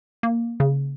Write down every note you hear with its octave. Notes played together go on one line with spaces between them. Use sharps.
A#3
C#3